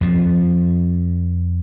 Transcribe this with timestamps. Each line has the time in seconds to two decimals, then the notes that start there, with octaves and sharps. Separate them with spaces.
0.01 F2 F3